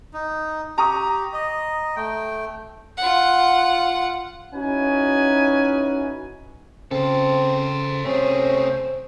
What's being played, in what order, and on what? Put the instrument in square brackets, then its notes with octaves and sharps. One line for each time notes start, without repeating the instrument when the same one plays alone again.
[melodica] D#4
[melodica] G4 [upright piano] A#5 C#6 D#6
[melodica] D#5
A3 G5
[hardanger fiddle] F4 F#5
[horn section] C#4 D#4 E4 F#4 B4 G#5
[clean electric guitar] C#3 [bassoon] C4 [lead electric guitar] A4 C5
[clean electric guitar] C3 [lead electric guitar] A3 G#4 [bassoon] C#4 [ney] C5